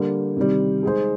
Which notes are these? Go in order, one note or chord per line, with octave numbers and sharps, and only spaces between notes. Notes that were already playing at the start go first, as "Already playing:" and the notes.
Already playing: D3 G3 A#3
C3 D#3 G3
G#3 D#4 G#4 C5